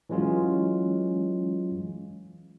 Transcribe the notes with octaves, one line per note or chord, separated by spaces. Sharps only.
E3 F#3 G#3 C#4 F4